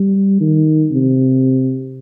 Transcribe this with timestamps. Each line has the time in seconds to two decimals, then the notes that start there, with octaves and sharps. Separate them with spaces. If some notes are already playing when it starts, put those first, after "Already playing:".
Already playing: G3
0.40 D#3
0.91 C3